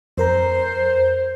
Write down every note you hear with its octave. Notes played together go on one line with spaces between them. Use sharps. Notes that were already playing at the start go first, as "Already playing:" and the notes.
F2 A#4 C5 A#5